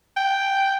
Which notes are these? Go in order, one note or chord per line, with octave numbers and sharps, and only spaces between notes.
G5